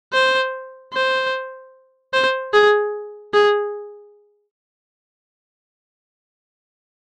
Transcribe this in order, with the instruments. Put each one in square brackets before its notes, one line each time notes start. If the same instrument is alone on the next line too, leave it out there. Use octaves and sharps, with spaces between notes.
[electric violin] C5
C5
C5
G#4
G#4